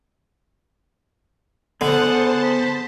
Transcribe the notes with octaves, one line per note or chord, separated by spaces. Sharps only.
D3 B3 G#4 B4 C5 F#5 A5
B6